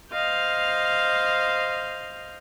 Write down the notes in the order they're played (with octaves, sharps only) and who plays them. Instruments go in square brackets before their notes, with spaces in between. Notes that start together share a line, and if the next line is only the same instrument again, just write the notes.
[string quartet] C5 D#5 F5 F6 G6